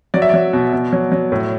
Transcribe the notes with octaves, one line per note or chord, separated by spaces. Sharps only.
F#3 D5
E5
F#3 D5
B2
B2
F#3
F#3
A2